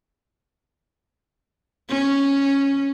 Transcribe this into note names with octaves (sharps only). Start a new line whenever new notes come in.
C#4